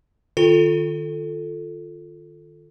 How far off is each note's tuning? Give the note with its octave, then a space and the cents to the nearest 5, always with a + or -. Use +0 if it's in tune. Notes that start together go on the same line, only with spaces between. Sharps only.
D#3 -35 F4 +0 A4 +0